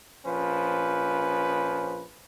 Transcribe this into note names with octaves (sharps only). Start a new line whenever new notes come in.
A#1 F3 C#4 B4